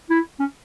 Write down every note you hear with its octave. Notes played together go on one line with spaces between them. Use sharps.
E4
C#4